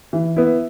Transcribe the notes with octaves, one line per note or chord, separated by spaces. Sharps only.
E3
B3 E4